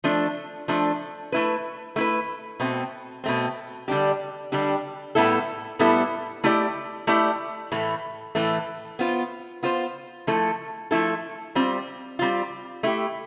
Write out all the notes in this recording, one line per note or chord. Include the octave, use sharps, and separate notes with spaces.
F3 A3 D4
F3 A3 D4
A3 E4 B4
A3 E4 B4
B2 A3 C4
B2 A3 C4
D3 G3 D4 G4
D3 G3 D4 G4
A2 G3 B3 E4 A4
A2 G3 B3 E4 A4
A3 E4 G4 D5
A3 E4 G4 D5
A2 E3 A3
A2 E3 A3
B3 F4 C5
B3 F4 C5
F3 A3 E4 A4
F3 A3 E4 A4
G3 C4 F4
G3 C4 F4
A3 E4 G4